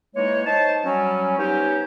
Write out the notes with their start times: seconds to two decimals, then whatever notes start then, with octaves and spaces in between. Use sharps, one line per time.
0.15 E3 G#3 A#3 D#4 C#5
0.46 D#4 C5 C#5 A5
0.84 F#3 G3 C#4
1.38 B3 C#4 D#4 G4 C5 C#5